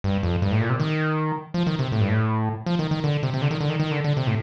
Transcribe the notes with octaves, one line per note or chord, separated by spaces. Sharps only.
G2
F2
G2
A2
A#2
C3
D#3
F3
D#3
C3
A2
G2
A2
F3
D#3
D#3
D3
C3
C3
D3
D#3
D3
D#3
D#3
D3
D3
C3
A2